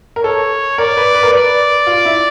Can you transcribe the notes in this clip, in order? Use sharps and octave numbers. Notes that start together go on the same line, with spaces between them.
A#4
A4 C#5
A#4 D5
B4
B4
A#4
B4 D5
F4
E4